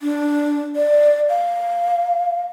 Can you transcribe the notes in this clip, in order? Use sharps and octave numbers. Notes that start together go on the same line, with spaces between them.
D4
D5
F5